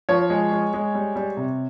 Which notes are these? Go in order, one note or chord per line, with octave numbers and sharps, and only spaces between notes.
F3 C#5
G#3
G#3
G#3
G3
G3
C3